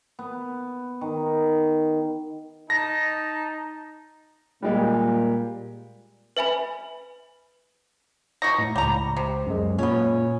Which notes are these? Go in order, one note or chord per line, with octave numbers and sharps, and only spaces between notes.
B3
D#3
D#4 A5 A#6
A#2 G3 G#3 A#3 G4
B4 E5 G#5 B5
B2 D#4 C#6 A#6
A2
C#2 G3 A#5
C3
F#2 G#3
A#2 B3 C#4